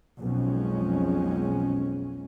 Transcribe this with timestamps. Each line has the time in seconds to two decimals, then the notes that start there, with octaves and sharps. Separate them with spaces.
0.21 B1 F2 G#3 C#4